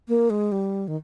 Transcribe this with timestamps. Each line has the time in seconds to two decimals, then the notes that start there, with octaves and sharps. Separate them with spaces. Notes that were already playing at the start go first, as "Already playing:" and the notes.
0.08 A#3
0.30 G#3
0.52 G3
0.88 D#3